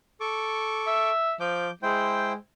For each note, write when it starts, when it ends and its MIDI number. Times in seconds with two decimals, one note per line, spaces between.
0.20 1.10 69
0.20 1.10 85
0.20 1.10 86
0.87 1.33 76
1.40 1.69 53
1.40 1.71 86
1.40 1.71 91
1.83 2.37 56
1.83 2.32 64
1.83 2.32 72
1.83 2.32 79